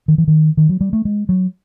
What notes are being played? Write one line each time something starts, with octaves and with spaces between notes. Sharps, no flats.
D#3
E3
D#3
D#3
F#3
G3
A3
G#3
F#3